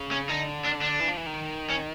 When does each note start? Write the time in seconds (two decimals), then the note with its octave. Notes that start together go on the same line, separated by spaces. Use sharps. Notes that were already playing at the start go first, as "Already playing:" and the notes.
Already playing: C#3
0.11 C#4
0.29 D3 D#4
0.65 D4
0.81 D4
1.00 E3
1.08 F3
1.17 E3
1.26 D#3
1.70 C#4